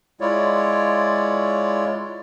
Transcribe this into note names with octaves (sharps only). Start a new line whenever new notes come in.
G#3 E4 F4 C#5 D5